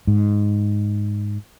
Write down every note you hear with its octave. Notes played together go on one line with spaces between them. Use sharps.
G#2